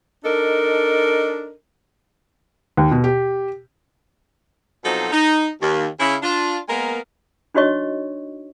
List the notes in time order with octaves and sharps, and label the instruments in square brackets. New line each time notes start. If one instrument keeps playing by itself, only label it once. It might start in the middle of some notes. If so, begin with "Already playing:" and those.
[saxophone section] D4 D#4 A4 A#4 D#5
[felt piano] D#2
B2
G4
[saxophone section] B2 F3 F#3 C4 D#4 A4
D#4
D#2
C#3 E4
D4 F4
G#3 A#3 B3 A#4
[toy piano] D4 D#4 F#4 C#5 D#5 C#6